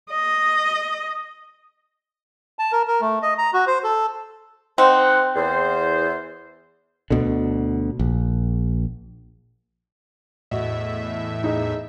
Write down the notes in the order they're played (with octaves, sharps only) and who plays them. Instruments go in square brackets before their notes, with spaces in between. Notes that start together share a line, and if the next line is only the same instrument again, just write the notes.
[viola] D#5
[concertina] A5
A#4
A#4
A3
D#5
A#5
F#4
C5
A4
[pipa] C4 [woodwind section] D#4 C5 F#5
[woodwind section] E2 C5
[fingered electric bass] D2 B2 D3
A#1
[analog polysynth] E2 A2 E5 [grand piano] F#4 D#5
[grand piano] D#4 G#4